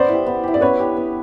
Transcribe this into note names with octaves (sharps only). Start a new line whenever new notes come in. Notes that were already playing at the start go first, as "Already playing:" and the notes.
Already playing: B3 C5 D5
E4 G4
B3
E4 G4
D5
B3 B4 C#5
D4 G4
B3